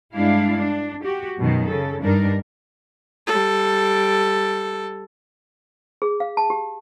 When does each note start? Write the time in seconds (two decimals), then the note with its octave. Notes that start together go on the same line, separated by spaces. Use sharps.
0.14 G2 G#3 D4 E4 F5
0.57 D4
1.04 F#4 G4
1.38 F#2 B2 D#3
1.66 C#3 A4
2.03 G2 G3 D4 D#4 A#4
3.27 G3 A4
6.02 G#4
6.20 F5
6.37 A5
6.50 G4